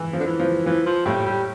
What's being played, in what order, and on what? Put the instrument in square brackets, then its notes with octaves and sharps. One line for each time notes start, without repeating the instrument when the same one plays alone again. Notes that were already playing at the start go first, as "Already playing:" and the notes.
Already playing: [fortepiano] E3
F3
[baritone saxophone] D3
E3
[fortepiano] F3
[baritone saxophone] E3 [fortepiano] F3
[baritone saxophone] F3
[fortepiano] A2 [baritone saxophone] G3
[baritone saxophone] G3